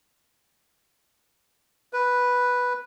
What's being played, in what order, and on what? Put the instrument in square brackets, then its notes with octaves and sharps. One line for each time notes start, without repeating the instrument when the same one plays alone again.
[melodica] B4